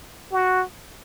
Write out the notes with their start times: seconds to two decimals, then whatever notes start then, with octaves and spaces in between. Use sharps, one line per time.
0.32 F#4